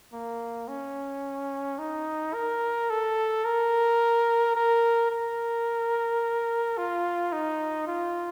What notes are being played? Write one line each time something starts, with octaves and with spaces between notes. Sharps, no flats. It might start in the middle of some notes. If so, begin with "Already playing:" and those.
A#3
C#4
D#4
A#4
A4
A#4
A#4
A#4
F4
D#4
F4